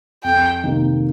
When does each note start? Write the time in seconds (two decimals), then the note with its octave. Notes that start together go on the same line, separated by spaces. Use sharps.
0.24 F2 G5
0.64 C3 D#3 A#3